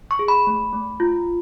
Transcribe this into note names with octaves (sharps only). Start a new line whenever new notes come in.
C#6
G#4
B5
A3
A3
F4